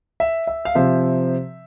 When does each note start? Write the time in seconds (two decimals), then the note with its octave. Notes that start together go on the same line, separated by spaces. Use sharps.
0.20 E5
0.47 E5
0.65 F5
0.75 C3 F3 C4 E5